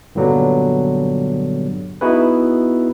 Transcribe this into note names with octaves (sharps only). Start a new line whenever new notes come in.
G2 A#2 D3 F#3 G3 B3
B3 D#4 E4 F#4 G#4 B4